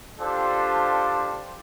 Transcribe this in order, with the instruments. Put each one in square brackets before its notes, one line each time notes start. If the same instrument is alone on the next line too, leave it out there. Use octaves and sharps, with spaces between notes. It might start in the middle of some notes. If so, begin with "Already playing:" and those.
[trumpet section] D4 F4 G4 A4 C5